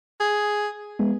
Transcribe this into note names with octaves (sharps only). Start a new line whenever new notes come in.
G#4
G#3 B3